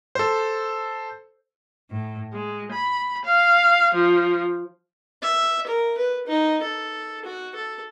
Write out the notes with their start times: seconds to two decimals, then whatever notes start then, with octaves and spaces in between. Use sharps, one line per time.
0.15 A4 C5
1.91 A2
2.33 G#3
2.71 B5
3.25 F5
3.94 F3
5.22 E5
5.67 A#4
5.98 B4
6.27 D#4
6.62 A4
7.25 F#4
7.55 A4